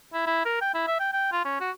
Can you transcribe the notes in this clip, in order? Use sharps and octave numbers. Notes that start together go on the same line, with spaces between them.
E4
E4
A#4
G5
E4
E5
G5
G5
F4
C#4
F#4